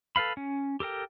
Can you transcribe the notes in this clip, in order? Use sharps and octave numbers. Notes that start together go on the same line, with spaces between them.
A4 B4 F5 B5
C#4
G4 A4 A#4 G5